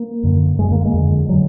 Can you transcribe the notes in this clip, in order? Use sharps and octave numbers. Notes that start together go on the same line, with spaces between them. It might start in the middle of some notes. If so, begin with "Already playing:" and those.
Already playing: A#3
F#2 D3
F#2 D3 G#3
A#3
G#3
F2 D3
D3 F#3